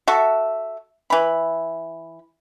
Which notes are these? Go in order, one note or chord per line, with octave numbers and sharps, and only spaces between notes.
F#4 A4 E5
E3 B5